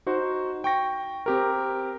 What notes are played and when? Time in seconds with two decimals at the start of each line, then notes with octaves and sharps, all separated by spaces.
0.06 D#4 F#4 C5
0.64 G5 C#6 A#6
1.26 C4 G4 A#4